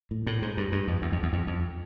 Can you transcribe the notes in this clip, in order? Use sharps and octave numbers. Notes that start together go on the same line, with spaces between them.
A2
A2
G#2
G2
G2
F2
E2
F2
E2
F2
F2